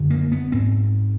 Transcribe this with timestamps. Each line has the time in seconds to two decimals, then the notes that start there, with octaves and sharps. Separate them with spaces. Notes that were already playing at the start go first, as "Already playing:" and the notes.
Already playing: F#2 D3
0.10 A#3
0.32 B3
0.52 G#2 C4